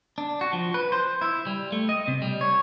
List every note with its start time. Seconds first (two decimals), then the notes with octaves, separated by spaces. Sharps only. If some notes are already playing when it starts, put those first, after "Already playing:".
0.18 D4
0.41 F#4
0.53 F3
0.74 B4
0.92 C5
1.22 E4
1.46 G3
1.72 A3
1.89 D#5
2.08 C3
2.22 G3
2.41 C#5